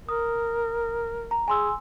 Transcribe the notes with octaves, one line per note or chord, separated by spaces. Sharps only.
A#4 D#6
A#5
G#4 G#5 C6 E6